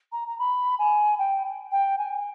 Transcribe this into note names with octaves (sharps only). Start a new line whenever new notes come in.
A#5
A#5
B5
G#5
G5
G5
G#5